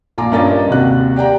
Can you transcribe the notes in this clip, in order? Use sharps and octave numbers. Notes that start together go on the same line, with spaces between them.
A#1 F4 G#5 A#5 D6
G2 C#4 A#4 D#5 A6
D#2 C3 F#4 F#6
G4 D5 G5 A#5